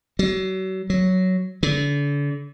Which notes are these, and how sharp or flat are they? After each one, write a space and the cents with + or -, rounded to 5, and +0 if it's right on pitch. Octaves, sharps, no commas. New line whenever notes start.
F#3 +35
F#3 +5
D3 -35